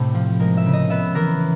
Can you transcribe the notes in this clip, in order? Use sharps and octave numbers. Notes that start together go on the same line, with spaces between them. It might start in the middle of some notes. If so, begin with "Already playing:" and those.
Already playing: A2 C3 A3
F3
G#3 A#4
E5
C#3
D#5
B3 E5
E3 A#4